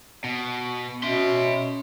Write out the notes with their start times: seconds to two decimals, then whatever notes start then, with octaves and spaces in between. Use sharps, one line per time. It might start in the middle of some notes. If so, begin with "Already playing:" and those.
0.24 B2
1.03 B2 C#4 E5 C6